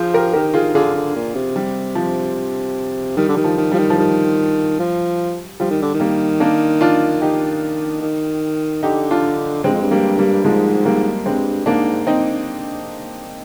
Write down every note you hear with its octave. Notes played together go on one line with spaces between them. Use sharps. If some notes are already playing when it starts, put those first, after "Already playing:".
Already playing: F3 G#4 C5
G4 A#4
D#3 G4 A#4
F4 G#4
D3 F4 G#4
D3
A#2
C3
G3
F3
D#3 G3
D3
D#3 G3
F3
D#3
F3 G3
D#3
F3
D#3 G3
F3
F3 G3
D#3
D3
D#3
G3 A#3
A#3 D4
D4 F4
D#3 D#4 G4
D#3
D3 D#4 G4
D4 F4
G2 G#3 C4
F2
G2
G3 A#3
G3 A#3
G#2 F3 G#3
G3 A#3
G2 G#3 C4
G#2 A#3 D4
C4 D#4